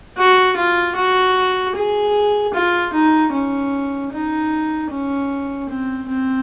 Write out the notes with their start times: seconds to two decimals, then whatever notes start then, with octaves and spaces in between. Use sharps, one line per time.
0.17 F#4
0.57 F4
0.96 F#4
1.75 G#4
2.54 F4
2.93 D#4
3.33 C#4
4.13 D#4
4.91 C#4
5.69 C4
6.09 C4